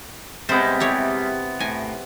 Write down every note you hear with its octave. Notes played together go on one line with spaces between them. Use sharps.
C3 G3 G#3 B3 C5
E4 G4 C#5
A2 G#5